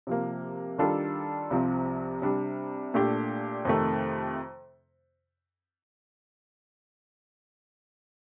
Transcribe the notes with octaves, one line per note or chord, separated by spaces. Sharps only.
C3 F3 A#3
D#3 G3 D4 F4 A4
C2 C3 F3 C4
C3 G3 D4
A#2 A3 D4 G4
F2 C3 D#3 A3